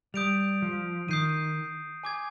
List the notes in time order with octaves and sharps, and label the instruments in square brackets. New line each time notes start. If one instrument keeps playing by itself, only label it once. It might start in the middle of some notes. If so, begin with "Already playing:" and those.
[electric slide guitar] G3 [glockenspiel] D#6 G6 D7 F7
[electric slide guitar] F3
[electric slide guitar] D#3 [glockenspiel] D#6 G6 C7 D#7
[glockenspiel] G#5 D6 G#6